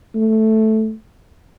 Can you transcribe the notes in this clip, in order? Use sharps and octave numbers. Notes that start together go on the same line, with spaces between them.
A3